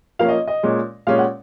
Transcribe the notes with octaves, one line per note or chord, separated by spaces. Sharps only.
F3 A#3 C#4 F5
D#5
D#5
A#2 G#3 C#4
A#2 G#3 C#4 F5
F#5